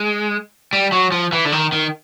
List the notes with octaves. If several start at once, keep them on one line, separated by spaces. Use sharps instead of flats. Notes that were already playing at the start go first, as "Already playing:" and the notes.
Already playing: G#3
G3
F#3
F3
E3
D3
D#3
D#3